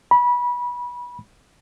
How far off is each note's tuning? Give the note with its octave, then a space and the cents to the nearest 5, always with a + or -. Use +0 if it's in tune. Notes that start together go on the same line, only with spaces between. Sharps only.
B5 -25